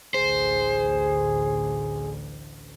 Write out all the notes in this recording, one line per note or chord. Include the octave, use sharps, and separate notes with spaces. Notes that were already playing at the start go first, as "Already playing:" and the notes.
A1 D2 G#4 C5